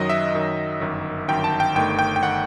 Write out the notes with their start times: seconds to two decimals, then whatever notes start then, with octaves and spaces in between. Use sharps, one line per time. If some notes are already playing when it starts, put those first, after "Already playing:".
Already playing: F#2 D#3 F#3 D#5
0.10 E5
0.34 F#2 D#3 F#3
0.81 G1 F#2 D#3
1.28 G1 F#2 D#3 G5
1.44 A5
1.60 G5
1.75 G1 G2 D#3 A3 G5
1.99 G5
2.16 G5
2.23 D#3 A3 F#5